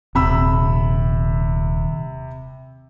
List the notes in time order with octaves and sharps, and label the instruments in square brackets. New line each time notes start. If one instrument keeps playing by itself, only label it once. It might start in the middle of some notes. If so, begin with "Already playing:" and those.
[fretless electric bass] D#1 [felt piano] C3 B5 E6